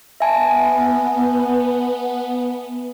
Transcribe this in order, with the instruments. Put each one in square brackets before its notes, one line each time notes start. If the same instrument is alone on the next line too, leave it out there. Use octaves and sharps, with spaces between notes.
[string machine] B3 [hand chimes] E5 G#5 A5